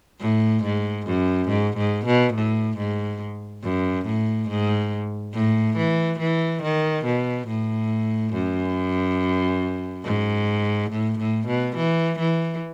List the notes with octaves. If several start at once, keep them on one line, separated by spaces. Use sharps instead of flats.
A2
G#2
F#2
G#2
G#2
B2
A2
G#2
F#2
A2
G#2
A2
E3
E3
D#3
B2
A2
F#2
G#2
A2
A2
B2
E3
E3